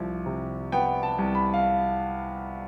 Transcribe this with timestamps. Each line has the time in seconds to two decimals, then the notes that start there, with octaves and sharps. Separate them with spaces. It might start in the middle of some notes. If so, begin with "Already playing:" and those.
Already playing: C2 F3
0.26 C3
0.72 B3 G5
1.03 A5
1.18 C2
1.35 B5
1.54 F5